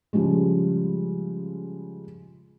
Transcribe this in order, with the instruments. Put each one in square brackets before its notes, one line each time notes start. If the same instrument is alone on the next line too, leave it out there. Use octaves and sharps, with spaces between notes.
[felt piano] C#3 F3 G3 G#3